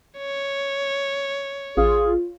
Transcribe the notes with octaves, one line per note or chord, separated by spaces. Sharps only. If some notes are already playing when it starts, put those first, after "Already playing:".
C#5
A1 F4 G#4